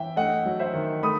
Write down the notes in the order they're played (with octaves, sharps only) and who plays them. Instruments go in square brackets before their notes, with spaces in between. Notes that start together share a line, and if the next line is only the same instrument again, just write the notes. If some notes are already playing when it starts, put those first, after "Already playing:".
Already playing: [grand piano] E3 [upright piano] E5 G5
[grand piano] A3 [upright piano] D#5 F#5
[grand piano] F#3
[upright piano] C5 E5
[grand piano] D#3
[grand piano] A3 [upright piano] B5 D#6